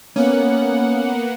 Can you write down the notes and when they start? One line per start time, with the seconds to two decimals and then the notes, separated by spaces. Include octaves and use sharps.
0.16 A#3 B3 C#4 F#5